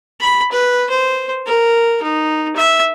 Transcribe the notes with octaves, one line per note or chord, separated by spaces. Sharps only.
B5
B4
C5
A#4
D#4
E5